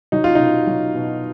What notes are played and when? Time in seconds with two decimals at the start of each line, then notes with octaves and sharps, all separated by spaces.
0.12 F#3 D#4
0.24 F4
0.35 B2 D#4
0.67 F#3
0.95 B2